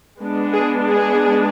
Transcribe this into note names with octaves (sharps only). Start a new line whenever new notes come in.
G#3 B3 D4
G#4
G#4